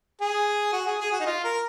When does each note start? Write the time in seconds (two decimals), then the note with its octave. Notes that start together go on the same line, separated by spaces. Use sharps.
0.21 G#4
0.73 F#4
0.87 G#4
1.00 G#4
1.12 F#4
1.20 D#4
1.26 F4
1.44 A#4